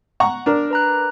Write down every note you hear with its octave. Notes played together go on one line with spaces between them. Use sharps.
F#5 A#5 C#6
D4 A#4
B4 A#5 F#6